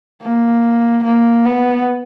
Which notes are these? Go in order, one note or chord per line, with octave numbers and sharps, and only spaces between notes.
A#3
A#3
B3